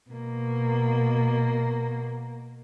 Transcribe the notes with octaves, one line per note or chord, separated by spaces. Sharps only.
B2 A#3